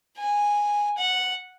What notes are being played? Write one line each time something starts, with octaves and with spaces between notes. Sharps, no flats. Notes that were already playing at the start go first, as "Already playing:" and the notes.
G#5
F#5